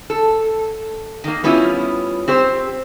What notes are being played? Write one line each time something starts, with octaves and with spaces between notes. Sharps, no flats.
A4
D#3 A#3
G3 B3 C#4 E4 F4
C4 G4 C5